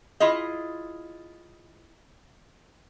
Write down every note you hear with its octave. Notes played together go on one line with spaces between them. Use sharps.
E4 F4 G#4 D#5